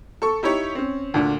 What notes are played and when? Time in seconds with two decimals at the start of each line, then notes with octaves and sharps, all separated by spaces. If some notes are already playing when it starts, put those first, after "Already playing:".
0.22 A4 C#6
0.43 D#4 E4 G4 C#5
0.75 C4 C#4
1.14 D2 A#2 D3